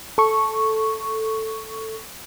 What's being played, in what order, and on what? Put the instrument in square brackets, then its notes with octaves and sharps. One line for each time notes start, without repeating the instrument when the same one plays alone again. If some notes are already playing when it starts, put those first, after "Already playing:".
[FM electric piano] A4 C#6